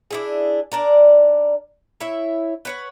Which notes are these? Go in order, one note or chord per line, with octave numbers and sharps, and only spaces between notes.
D4 E4 G#4
D4 A#4 D5
E4 C#5 E5
B4 C#5 F#5